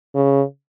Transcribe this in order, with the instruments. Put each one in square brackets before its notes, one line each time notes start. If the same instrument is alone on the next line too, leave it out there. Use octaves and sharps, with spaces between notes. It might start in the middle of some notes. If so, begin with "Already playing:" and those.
[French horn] C#3